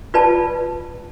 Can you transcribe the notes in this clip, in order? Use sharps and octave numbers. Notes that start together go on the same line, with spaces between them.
F4 B4 D5 A5